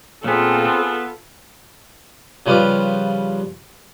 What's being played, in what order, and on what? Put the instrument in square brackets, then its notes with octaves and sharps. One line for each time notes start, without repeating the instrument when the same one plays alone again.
[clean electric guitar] A#2 B3 [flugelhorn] C4 [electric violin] F4 A4 [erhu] G#4
[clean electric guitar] B3
[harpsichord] C#3 F3 G3 B4 F5 D6